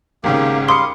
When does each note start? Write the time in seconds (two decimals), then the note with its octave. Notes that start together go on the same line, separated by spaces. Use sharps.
0.24 G#1 G#2 C#3 A#3 G4
0.69 G3 F5 C6 D6 D#6 C#7